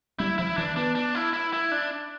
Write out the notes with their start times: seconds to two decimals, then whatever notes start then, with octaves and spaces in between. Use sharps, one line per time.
0.19 G3 E4
0.38 F3 E4
0.57 E3 D4
0.76 B3 D4
0.95 D4
1.15 E4
1.33 E4
1.53 E4
1.72 D4